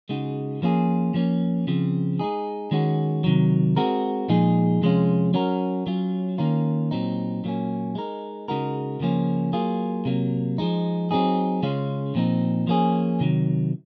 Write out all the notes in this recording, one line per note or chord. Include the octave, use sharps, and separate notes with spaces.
C#3 G#3 D#4 F#4
F3 A#3 C#4 F4 G#4
F3 A#3 C#4
C#3 F3 C4
G#3 D#4 G#4
D#3 G#3 C#4 F#4
C3 D#3 F#3
G#3 C4 F#4 A#4
A#2 F3 G#3 D#4 G#4
C3 F3 G#3 C#4 F4
F#3 C#4 F#4 A#4
F#3 C#4 F4
D#3 A#3 C#4 F4 A#4
A#2 F#3 C4 D#4
A#2 F#3 A#3 C#4
G#3 D#4 A#4
C#3 G#3 D#4 F#4 A#4
C#3 F3 A#3 C#4
F#3 A#3 F4 G#4
C3 F#3 A#3
F3 G#3 D#4
F#3 C4 D#4 G#4
C#3 G#3 C#4 F4
A#2 F3 C4 D#4
F3 A#3 C#4 G#4
C3 D#3 F#3